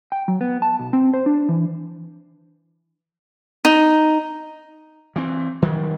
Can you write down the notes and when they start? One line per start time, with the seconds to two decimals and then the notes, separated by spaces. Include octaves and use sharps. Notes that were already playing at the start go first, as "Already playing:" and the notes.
0.12 G5
0.28 F#3
0.41 B3
0.62 A5
0.79 B1
0.93 C4
1.14 C5
1.26 D4
1.49 E3
3.65 D#4
5.16 E3 C4
5.62 D#3 F#3 G3